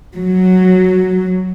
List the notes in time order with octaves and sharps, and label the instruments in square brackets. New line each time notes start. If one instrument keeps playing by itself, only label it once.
[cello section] F#3